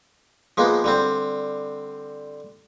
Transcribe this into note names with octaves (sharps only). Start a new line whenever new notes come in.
F3 G#3 A#3 B3
D3 G3 C4